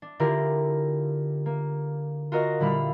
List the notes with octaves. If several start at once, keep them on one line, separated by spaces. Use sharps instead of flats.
D4
D3 E4 F4 G4 A#4
A#3
F4 F#4 A#4 D#5
A#2 D3 G3 E4 F5 B5